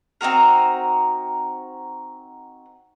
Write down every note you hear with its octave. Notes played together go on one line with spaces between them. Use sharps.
C4 D#4 F#4 A#4